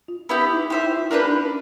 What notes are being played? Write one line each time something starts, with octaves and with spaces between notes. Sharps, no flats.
F4
B3 E4 G4
D#4
E4
D#4
D#4 G4 C5 E5
E4
F4
A#3 D4 E4 G4 B4
D4
C#4